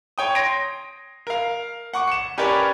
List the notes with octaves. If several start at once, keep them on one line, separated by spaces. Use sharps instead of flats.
C#5 G5 D#6
C6 A#6 D7
A#4 F5
F#5 C#6 D6
C#7 E7
C#4 G4 A#4 B4 C#5 D5